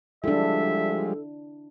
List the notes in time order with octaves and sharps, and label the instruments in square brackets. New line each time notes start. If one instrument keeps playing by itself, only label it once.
[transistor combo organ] F3 G3 G#3 [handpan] D4 E4 [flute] A4 [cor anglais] E5